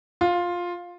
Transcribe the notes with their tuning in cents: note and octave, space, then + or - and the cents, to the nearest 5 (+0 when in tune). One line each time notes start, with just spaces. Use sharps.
F4 +10